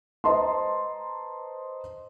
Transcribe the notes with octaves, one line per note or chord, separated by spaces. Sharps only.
B4 C5 D#5 A5 A#5 C6